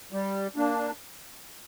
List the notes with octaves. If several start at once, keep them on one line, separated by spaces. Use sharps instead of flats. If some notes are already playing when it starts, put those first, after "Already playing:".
G3
A#3 D4